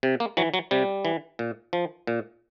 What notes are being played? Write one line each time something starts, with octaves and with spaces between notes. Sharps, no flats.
C3
A#3
E3 F#3
F#3
C3 G3
E3
A#2
F3
A#2